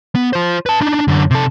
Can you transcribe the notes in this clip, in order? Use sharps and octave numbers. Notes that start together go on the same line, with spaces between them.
B3
F4 C5
B4 A5
D4 D#4
F#2 D3
C3 A4